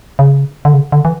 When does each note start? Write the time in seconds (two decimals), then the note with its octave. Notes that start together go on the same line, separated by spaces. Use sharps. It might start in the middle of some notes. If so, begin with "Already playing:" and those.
0.19 C#3
0.65 D3
0.74 C#3
0.92 D3
1.05 E3